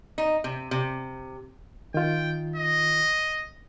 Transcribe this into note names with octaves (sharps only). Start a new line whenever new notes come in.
D#4
C3
C3
D#3 F4 G5
D#5